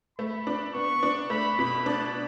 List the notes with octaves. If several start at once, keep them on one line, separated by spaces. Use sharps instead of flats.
A3 B5
D4
B3 C#6
D4
A3 B5
B2 B5
D4 A5